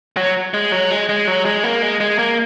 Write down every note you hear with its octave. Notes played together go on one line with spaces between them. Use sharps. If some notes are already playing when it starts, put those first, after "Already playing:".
F#3
G#3
F#3
G#3
G#3
F#3
G#3
A#3
G#3
G#3
A#3